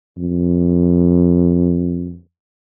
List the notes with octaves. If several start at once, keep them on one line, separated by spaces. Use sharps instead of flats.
F2